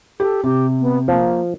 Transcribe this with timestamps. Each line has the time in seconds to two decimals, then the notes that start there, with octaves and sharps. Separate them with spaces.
0.20 G4 A4
0.43 C3 G4
0.80 B3
1.08 F3 A#3